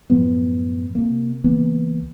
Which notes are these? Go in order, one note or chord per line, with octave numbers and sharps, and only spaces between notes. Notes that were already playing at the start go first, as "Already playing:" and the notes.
F#2 A2 F3 B3
C3 A#3
C#2 E3 A#3 B3